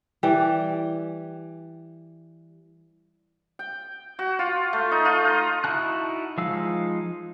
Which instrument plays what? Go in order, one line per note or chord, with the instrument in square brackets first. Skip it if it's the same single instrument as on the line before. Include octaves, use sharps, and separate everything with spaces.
[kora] E3 G3
[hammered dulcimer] G5
F#4
F4
A3
D#4
F4
A#5
[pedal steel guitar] D#4 E4 F#4 A5 F#6
F3 G#3 D#4 F5 E6